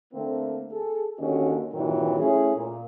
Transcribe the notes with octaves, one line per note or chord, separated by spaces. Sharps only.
D3 A3 A#3 C4
G#4 A4
D#2 D3 A#3 C#4 F#4 D#5
G2 A#2 D#3 E3 F#3 C4
A3 C#4 E4 G#4
A#2